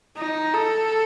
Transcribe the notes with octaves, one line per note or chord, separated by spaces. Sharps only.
D#4
A4